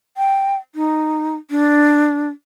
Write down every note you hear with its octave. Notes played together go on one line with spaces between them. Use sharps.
G5
D#4
D4